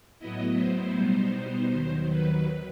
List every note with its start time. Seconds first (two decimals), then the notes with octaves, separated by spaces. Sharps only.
0.19 A2 F#3 B3 E4 D#5
0.57 C5
0.95 B2 G3 B3 D#4
1.71 D#2 D#3 F#3
2.09 B4